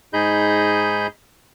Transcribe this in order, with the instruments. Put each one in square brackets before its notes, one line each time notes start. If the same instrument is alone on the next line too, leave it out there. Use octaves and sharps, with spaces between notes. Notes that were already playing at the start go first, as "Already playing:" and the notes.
[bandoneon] G#2 D#4 G#4 D#5 B5 G6